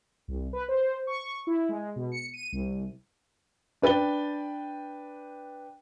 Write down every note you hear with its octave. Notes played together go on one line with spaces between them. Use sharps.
C2
B4
C5
C#6
E4
G#3
B2
C#7
D#7
C2
D4 B4 G5 A6 G7